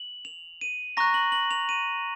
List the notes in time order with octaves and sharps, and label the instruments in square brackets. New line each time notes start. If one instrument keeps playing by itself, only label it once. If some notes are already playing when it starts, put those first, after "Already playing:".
Already playing: [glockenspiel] F#7
F7
D#7
A#5 C#6 F#6 A#6
F#7
F#7
F7
D#7